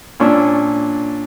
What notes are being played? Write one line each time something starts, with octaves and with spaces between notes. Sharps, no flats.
A#2 C#4 D4 C#6 E6